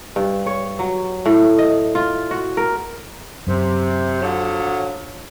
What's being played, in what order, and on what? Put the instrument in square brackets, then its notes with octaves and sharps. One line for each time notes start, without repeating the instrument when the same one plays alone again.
[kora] G2
C#5
F#3
A2
D#5
F4
F#4
A#4
[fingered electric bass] F#2 [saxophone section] C3
[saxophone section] D3 F3 F#3